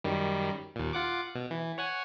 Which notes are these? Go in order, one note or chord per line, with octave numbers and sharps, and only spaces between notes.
F#2 D#3 G3
D#2 A#2
F4 F#5 D6
B2
E3
C#5 F#5 G#5